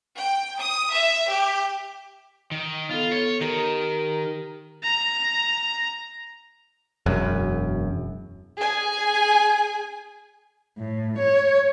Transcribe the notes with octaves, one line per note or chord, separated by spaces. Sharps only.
G5
D#6
E5
G4
D#3
B3 F4 A4
C#5
D#3 G4 A#4 A#5
A#5
E1 F#2
G#4 G#5
A2
C#5